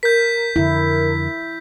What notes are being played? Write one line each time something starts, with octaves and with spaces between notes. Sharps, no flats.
A#4 G6 B6
F2 D3 E4